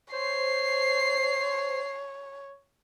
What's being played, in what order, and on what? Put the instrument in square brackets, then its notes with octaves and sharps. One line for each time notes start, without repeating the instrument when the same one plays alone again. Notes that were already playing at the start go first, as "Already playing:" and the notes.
[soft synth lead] C5 [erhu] C#5 [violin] C7